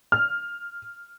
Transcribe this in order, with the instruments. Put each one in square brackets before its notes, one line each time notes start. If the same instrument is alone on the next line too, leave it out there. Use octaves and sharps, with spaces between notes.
[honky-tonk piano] F6